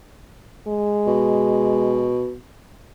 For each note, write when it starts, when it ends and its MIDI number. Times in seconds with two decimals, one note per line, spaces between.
0.68 2.15 56
1.07 2.35 47